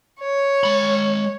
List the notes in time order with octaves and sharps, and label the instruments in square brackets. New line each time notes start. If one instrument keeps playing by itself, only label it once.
[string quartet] C#5
[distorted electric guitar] G#3 B5